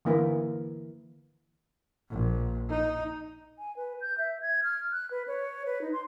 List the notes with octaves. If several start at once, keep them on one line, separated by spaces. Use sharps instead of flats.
D3 E3 A#3 E4 A#4 B4
A#1
D#4
G#5
B4
G6
E5
G#6
F6
F#6
B4
C#5
B4
D#4
C6